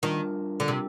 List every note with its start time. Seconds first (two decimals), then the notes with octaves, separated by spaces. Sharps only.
0.03 D#3 G3 D4 F4 A#4
0.60 D3
0.68 C3